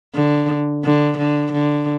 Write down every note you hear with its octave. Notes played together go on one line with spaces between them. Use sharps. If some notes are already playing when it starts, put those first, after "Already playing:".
D3
D3
D3
D3